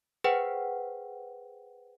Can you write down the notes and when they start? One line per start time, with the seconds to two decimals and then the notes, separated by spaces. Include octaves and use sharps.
0.24 G#4 B4 C5 F#5 G5